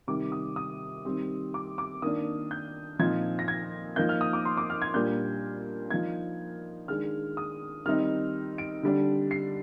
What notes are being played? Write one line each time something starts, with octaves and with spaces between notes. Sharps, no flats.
C3 D#3 G3 D6
D#6
D#6
D#3 G3 C4
D6
D6
D#3 A#3 D4 D#6
G6
A#2 F3 C4 D#4 G#6
A#6
G#6
F3 A#3 D#4 G6
F6
D#6
D6
C6
D6
F6
G#6
A#2 G3 A#3 D4 G6
F3 A#3 D#4 G#6
D#3 G#3 D4 F6
D#6
D#3 G3 C4 D#4 F6
D7
D3 G3 D4
C7